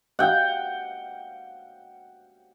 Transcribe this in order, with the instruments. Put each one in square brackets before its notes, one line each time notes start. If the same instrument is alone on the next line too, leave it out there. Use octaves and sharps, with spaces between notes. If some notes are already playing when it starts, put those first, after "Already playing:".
[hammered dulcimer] F#5 G5